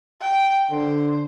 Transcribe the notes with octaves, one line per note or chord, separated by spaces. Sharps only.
G5
D3 C5